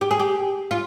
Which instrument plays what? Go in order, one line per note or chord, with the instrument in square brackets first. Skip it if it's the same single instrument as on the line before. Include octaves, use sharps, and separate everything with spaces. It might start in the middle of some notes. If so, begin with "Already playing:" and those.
[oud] G4
G#4
G4
F4